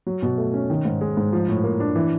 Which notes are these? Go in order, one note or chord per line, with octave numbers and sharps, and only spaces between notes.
F#3
B2
A3
C#4
D#3
G#2
G#3
G#2
F3
A2
A#3
D4
E3